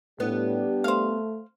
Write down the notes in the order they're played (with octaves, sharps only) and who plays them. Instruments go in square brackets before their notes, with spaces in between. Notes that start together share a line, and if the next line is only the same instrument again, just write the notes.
[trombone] A2 [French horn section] G3 D4 G4 [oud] B3
[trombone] A3 [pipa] C5 F5